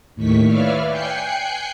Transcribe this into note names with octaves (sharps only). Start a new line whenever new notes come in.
D#2 A2 D#3 C#6 B6
B4 C#5 D5 E5 F5 F6
G5 G#5 F#6 G6 C7 C#7